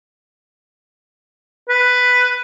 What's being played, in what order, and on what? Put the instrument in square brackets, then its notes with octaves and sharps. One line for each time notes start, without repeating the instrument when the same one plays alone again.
[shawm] B4